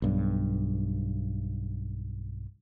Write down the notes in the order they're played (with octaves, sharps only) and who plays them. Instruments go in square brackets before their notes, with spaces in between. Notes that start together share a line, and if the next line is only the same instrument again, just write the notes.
[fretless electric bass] B1 G2